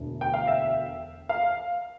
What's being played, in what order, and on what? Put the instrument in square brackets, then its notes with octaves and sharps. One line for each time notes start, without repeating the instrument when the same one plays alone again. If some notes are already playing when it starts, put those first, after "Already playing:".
Already playing: [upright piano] E1 D2 D3
G5
F5
E5
F5